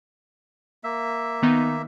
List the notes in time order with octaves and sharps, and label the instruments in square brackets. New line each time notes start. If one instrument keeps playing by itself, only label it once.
[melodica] A#3 E5
[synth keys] D#3 B3 D#4